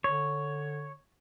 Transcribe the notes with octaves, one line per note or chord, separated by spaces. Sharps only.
D3 C#5